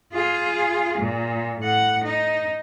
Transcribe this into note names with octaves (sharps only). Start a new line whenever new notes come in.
F4 G#4
A#2
A2 F#5
D#4